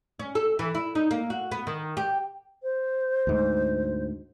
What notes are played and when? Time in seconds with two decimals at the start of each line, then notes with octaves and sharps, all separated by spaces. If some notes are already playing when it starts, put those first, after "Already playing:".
0.19 C#4
0.35 A4
0.59 E3
0.75 E4
0.95 D#4
1.11 A#3
1.30 F#4
1.52 B3
1.67 D#3
1.97 G4
2.63 C5
3.27 D2 G#2